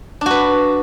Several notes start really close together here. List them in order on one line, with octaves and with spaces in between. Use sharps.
D4 F#4 B4